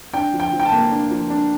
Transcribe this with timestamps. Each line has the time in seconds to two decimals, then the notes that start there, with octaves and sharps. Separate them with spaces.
0.13 D4 G5
0.33 F3
0.40 G5
0.52 F3
0.60 G5
0.65 A5
0.72 A#3
0.91 D4
1.10 F3
1.30 D4